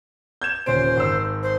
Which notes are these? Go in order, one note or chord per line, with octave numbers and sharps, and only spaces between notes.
G6 G#6 E7
D#1 C#4 C5 D7
G#1 E6
C5